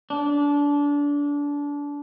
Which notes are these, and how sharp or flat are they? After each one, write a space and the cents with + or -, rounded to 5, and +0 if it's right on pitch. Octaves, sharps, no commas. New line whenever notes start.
D4 -25